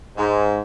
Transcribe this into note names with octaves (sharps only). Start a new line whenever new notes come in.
G#2